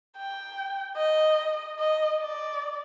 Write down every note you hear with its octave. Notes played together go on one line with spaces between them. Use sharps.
G5
D#5
D#5
D5